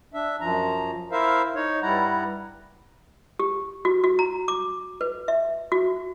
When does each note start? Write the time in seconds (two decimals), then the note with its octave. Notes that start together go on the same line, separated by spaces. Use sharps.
0.14 D4 E5
0.41 F#2 F3 A#5
1.12 E4 A#4 C5 E5 F5
1.55 D#4 C#5
1.82 G2 G3 E4 F#5 A#5
3.39 G4
3.85 F#4
4.04 F#4
4.19 A#5
4.48 D6
5.01 B4
5.28 E5
5.72 F#4